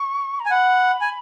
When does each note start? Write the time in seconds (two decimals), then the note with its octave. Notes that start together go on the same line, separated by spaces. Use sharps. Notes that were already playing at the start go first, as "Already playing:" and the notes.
Already playing: C#6
0.40 A#5
0.46 G#5
0.50 F#5 B5
1.01 G#5